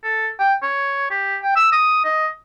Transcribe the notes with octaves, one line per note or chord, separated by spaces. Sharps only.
A4
G5
C#5
G4
G5
E6
D#6
D#5